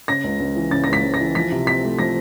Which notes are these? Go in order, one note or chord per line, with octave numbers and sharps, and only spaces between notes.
C#3 A#6
C#2
C#2
E3
C#3 A6
C#2 A#6
B6
C#2
A#6
E3
F3 B6
C3
C4 B6
A3
F3 A#6